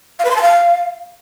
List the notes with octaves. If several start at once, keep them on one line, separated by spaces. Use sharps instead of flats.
F5
B4
C6
A5
F5